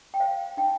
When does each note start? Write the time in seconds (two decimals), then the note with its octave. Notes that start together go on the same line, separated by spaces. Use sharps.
0.14 G5
0.20 C5 F5
0.57 D#4 G5